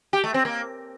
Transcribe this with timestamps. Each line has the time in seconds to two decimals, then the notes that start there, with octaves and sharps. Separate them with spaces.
0.13 G4
0.24 A3
0.34 C4
0.45 A#3